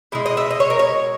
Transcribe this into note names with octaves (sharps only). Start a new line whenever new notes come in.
B2 G#3 E4
D#5
E5
D#5
C#5
A#4
C#5